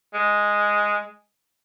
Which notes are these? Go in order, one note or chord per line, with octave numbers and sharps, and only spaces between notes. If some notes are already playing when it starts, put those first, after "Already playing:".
G#3